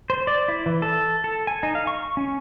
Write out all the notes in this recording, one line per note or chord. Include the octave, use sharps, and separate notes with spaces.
C5
D5
E4
E3
A4
A4
G#5
D#4
F5
C#6
C#4